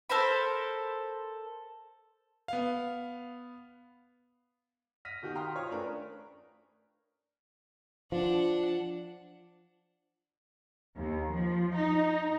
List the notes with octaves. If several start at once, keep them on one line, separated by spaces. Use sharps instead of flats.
A4 A#4 C5 B5
B3 F5
F6 A#6 B6 D#7
B2 D#3 F#4 G4
F5 G5 A#5 C6 D#6 F6
F4 C#5 D#6
A3 C#4 D4 A#4 B4
F3 D4 F#5
D#2
F3
D#4